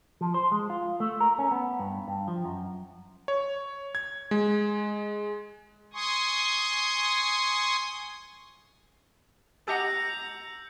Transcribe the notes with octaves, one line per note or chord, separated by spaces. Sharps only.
F3
C5
G#3
F4
A3
A#4
C#4
B3
G2
G2
F3
F#2
C#5
G#6
G#3
G#5 C6 C#6 D#6
G4 D#5 F#5 A#5 E6 G6 C#7